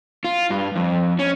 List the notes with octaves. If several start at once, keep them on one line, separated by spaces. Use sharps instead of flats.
F4
G2
F2
C#4